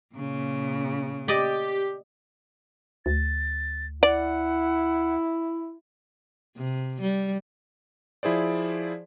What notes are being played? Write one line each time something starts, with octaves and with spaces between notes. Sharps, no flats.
A#2 C#3
G4 D5 D#5
D2 A6
E4 D5 F#5
C3
G3
F3 E4 G#4 C5 D5